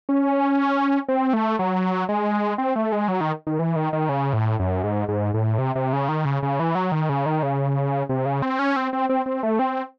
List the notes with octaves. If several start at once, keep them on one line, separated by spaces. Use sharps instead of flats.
C#4
C4
A3
F#3
G#3
C4
A3
G#3
F#3
D#3
D#3
E3
D#3
D#3
C#3
A2
F#2
G#2
G#2
A2
C3
C3
C#3
D#3
C#3
C#3
E3
F#3
D#3
C#3
D#3
C#3
C3
C#3
C4
C#4
C4
C4
C4
C4
A3
C4